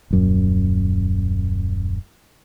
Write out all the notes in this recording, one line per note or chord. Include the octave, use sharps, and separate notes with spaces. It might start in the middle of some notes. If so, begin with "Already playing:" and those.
D#1 F#2